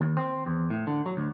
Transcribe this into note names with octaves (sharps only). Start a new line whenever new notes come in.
D#2
C4
E2
A2
D3
F#3
D2